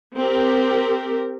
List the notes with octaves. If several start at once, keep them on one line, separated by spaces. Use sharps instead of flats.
C4 G4 A#4